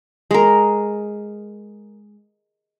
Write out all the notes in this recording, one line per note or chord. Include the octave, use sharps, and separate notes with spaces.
G#3 A#4